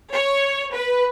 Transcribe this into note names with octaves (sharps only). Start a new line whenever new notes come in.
C#5
B4